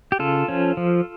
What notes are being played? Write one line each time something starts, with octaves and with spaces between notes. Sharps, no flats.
G4
C#3 F4 A4
F3 C#4
F3